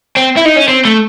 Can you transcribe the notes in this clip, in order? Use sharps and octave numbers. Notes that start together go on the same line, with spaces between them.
C4
E4
D#4
C#4
C4
A3